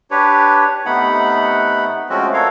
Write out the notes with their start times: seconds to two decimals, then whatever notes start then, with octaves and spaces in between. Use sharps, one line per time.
0.11 D4 G4 B4 C#5
0.86 C3 A3 B3 D#4 F#5 B5
2.10 F3 G#3 A3 C4 C#4 F#4
2.33 A4 A#4 C#5 F5